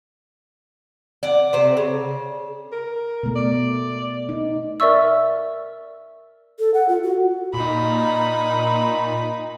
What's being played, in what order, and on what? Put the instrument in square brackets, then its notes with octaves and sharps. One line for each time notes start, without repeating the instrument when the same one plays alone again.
[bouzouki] D5 F#5
C3 C4
C#3
[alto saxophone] A#4
[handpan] B2 A3
[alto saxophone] D5
[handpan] D#4
[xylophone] A#4 D5 E5 C#6 E6
[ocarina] A4
F#5
F4
F#4
[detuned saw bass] A#2 [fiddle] D#4 B5